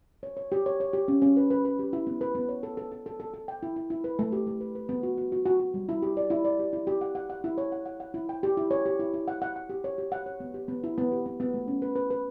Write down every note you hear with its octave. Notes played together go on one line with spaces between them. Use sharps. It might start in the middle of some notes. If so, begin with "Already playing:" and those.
C#5
C#5
G4
C#5
C#5
G4
C#4
C#4
B4
B4
B4
G4
E4
B3
B4
B3
C#5
A4
A4
A4
A4
A4
A4
G5
E4
E4
E4
B4
A3
G4
A3
B4
B4
B3
F#4
F#4
F#4
F#4
F#4
G3
E4
G4
D5
E4
D5
G4
E4
G4
F#5
F#5
F#5
E4
C#5
F#5
F#5
F#5
E4
G5
G4
E4
C#5
G4
E4
E4
F#5
F#5
F#5
G4
C#5
G4
F#5
C#5
B3
G4
B3
E4
B3
G4
B3
B3
A3
C#4
B4
B4
B4